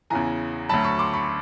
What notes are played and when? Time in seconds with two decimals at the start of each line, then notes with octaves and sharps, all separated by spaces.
0.10 E2 C#3 E3 G#5 A#5
0.69 D2 D3 F#3 A5 B5
0.84 B5 C#6
0.99 C6 D6
1.13 B5 C#6